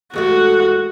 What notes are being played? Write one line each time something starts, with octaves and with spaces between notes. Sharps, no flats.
E2 G#3 A3 F#4